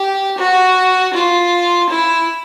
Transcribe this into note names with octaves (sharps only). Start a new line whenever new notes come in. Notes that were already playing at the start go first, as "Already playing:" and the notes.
Already playing: G4
F#4
F4
E4